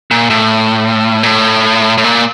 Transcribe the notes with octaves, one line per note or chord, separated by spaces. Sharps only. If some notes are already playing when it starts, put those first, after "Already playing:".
A#2
A2
A#2
A2
A2
A#2